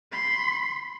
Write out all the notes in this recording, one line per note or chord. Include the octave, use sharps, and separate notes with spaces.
B5 C6